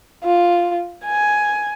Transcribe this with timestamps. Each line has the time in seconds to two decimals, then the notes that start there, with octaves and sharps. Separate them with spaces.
0.24 F4
1.05 G#5